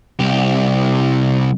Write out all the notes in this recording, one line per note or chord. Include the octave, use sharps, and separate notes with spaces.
C2 G4